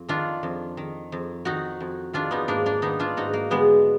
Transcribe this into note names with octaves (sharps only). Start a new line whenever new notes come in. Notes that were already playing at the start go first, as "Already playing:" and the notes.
Already playing: F2
D#3 D4 F4
F2
D#3
F2
D#3 D#4 F#4
F2
D#3 D4 F4
B3 D#4
G#2 A#3 D4
A#3 D4
D#3 B3 D#4
D4 F4
G#2 D#4 F#4
A#3
D3 G#3 B3